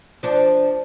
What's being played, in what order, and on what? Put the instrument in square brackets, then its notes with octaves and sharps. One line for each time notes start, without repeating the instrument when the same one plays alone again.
[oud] F3 D4